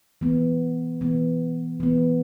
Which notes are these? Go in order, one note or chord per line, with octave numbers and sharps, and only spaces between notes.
E3 B3
E3 B3
E3 B3